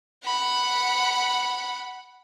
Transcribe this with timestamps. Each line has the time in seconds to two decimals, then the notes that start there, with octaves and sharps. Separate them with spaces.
0.25 F#5 B5